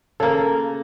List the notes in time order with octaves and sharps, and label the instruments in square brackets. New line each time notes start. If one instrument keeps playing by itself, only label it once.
[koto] C#3 A#3 [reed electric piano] A4 A#4